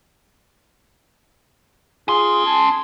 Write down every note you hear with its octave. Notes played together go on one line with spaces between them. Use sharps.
C#4 F4 G#4 C6
G#5 A5